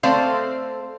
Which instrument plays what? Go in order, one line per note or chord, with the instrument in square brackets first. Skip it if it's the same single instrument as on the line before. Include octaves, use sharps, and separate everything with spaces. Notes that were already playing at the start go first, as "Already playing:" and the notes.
[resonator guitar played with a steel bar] A3 C4 A4 C5 D5 F5